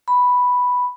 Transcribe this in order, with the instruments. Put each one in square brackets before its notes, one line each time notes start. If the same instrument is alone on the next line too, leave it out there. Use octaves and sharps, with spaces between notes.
[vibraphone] B5